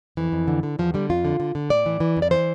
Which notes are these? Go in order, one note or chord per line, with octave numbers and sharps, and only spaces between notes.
F2 E3
F2
D3
D3
E2 F3
D3 G3
F2 F4
D3
D3
D3
A2 D5
E3
E3
F2
D5
E3 C5